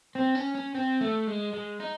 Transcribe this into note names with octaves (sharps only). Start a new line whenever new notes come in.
C4
C#4
C#4
C4
A3
G#3
G#3
D#4